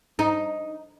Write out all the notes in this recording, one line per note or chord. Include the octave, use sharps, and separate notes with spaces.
D#4